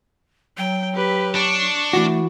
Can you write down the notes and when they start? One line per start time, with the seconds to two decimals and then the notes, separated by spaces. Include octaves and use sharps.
0.57 F#3 G5
0.94 G4 B4
1.36 D4 C#6
1.93 E3 A3 F#4